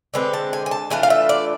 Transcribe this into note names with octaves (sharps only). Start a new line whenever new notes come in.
D3 G#3 C4 B4
A5
G#5
G#5
A5
E3 A3 D4 F4 G#5
F5
E5
D5